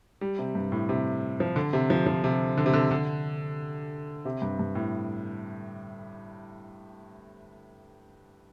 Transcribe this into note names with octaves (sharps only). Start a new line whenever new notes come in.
G3
C3
G2
A2
C3
F3
D3
C3
F3
F3
C3
D3
C3
D3
D3
C3
G2
G2
A2